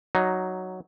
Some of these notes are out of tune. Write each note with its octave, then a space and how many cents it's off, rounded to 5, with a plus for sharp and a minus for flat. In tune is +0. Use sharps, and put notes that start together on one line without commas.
F#3 +0 D#4 +0